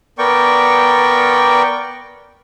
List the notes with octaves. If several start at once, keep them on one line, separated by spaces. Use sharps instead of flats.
B3 A#4 D5 G5 C#6